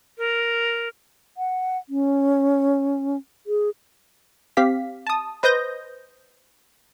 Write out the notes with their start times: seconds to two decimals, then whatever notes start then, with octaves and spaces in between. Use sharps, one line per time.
0.18 A#4
1.37 F#5
1.89 C#4
3.47 G#4
4.57 C4 G4 F5 B6
5.07 A5 D#6
5.43 B4 C5 D#5 D#6 G6 A#6